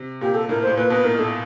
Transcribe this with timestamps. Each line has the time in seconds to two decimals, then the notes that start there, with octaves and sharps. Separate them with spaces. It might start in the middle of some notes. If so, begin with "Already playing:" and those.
Already playing: C3
0.21 A#2 G4
0.35 A4
0.49 A2 A#4
0.63 A2 C5
0.77 A#2 B4
0.90 B2 B4
1.04 A2 A#4
1.18 A2 A4